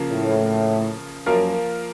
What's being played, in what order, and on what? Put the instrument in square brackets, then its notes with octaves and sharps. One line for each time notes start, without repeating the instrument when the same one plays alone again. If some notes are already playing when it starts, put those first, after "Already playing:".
Already playing: [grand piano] C#3 F3 A#3
[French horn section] A2
[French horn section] F#2 [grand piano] F3 A#3 F4 A#4